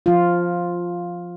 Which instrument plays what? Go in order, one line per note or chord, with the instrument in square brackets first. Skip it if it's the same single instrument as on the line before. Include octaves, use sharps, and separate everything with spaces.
[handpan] F3 F4